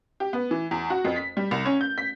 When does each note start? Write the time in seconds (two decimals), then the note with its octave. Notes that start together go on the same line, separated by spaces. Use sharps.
0.20 G4
0.33 B3
0.51 E3
0.71 E2
0.90 F#4
1.05 F2
1.16 B6
1.37 G3
1.51 C2
1.65 C#4
1.81 G6
1.98 B6